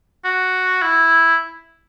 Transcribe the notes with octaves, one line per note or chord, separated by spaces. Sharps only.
F#4
E4